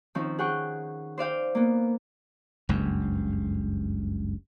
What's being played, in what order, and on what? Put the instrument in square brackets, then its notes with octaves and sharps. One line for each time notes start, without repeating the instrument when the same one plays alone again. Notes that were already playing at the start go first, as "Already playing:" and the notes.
[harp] D#3 F3 C4 C#4
G#4 F#5 G5 C#6
C5 D5 F5 G5
A#3 B3
[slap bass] F#1 C#2 G2